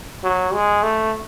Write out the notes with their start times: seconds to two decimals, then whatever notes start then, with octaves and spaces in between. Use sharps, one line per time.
0.23 F#3
0.53 G#3
0.83 A3